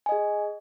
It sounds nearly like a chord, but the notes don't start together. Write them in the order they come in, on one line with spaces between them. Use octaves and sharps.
G#5 D#5 G#4